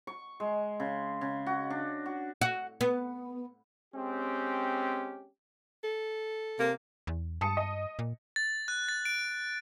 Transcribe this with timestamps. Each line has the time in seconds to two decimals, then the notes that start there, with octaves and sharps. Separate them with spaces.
0.07 C#6
0.40 G#3
0.80 C#3
1.21 C#3
1.46 F#4
1.70 D4
2.06 F#4
2.41 F#4
2.81 B3
3.94 G#3 C4 C#4 G4
5.84 A4
6.59 C3 A#3
7.07 E2
7.41 G2 A5 D#6 C#7
7.57 D#5
7.99 A#2
8.36 A6
8.68 F#6
8.89 A6
9.05 D7